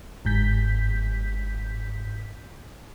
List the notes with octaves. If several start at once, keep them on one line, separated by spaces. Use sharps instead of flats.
G1 G#2 G6 B6